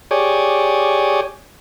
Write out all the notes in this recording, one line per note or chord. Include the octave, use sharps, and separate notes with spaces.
G4 G#4 C#5 D5